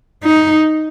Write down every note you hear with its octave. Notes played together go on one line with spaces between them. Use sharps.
D#4